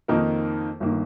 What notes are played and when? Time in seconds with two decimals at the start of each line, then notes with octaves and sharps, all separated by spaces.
0.08 F2 D#3 A#3 D#4 A#4
0.80 G1 D#3 A#3